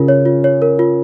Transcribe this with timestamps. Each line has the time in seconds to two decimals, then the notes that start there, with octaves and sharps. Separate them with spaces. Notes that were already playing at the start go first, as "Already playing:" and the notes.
Already playing: C#3 F4 A#4
0.08 C#5
0.26 F4
0.44 C#5
0.62 A#4
0.79 F4